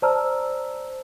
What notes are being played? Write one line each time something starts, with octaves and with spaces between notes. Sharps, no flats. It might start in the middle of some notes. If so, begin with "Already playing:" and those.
C5 D5 A5 A#5 E6 F6